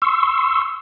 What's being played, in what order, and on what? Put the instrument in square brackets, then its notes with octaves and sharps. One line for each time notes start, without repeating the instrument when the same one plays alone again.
[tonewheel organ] C6 C#6 E6